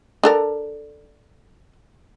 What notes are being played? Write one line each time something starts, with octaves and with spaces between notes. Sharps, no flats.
D4 A4 A#4